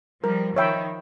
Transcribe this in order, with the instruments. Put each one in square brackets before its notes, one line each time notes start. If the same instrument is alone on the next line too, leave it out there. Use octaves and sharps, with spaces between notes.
[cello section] F3 G3 [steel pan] A#4
[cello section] D#3 F3 [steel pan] C#5 E5 G5 B5